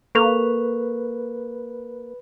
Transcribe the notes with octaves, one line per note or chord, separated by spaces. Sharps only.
A#3 A4 B4 C#6 F7